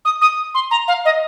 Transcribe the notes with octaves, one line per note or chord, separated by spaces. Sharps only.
D#6
D#6
C6
A#5
F5
D#5